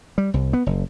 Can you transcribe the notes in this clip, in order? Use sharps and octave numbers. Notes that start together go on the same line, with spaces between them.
G3
C2
B3
F#1